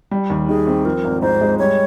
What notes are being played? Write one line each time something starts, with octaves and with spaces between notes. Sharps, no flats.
G3
D#2
D#3 G#4
C4
F3 A#4
G#1
G#2 C5
G#3
G3 C#5